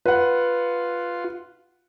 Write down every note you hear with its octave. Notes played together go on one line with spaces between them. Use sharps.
F4 B4 F#5